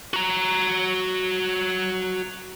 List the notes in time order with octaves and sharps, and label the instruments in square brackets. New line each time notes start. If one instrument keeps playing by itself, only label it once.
[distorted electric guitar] F#4 A#5